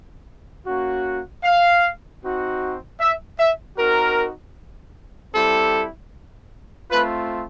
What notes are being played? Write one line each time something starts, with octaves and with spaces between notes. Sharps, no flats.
A#3 C#4 F#4
F5
C4 D#4 F#4
E5
E5
C4 D#4 F#4 A#4
G3 C4 E4 G4 A4
A3 C4 F4 B4